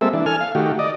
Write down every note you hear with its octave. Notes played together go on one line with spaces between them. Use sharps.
G3 G#3 A#3 C4 A4 E5
E3 D4
A4 G#5 F6
F5
D#3 A3 F#4 G4
D5 D#5